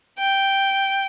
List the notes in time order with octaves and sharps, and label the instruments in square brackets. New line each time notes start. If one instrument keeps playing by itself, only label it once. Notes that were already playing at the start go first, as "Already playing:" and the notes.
[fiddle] G5